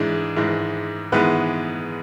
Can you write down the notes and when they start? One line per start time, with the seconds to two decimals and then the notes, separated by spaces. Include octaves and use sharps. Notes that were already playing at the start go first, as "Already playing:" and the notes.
Already playing: G#2 E3 G#3 D4
0.36 G#2 E3 G#3
1.12 G#2 E3 G#3 B3 B4